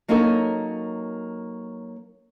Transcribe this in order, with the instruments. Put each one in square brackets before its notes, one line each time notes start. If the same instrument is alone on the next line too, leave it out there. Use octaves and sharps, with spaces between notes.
[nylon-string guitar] F#3 A#3 C#4 D#4 A4 A#4